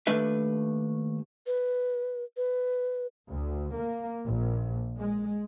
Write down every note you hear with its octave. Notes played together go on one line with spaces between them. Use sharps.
D#2 A3 D4 B4 E5
B4
B4
D2
A#3
A#1
G#3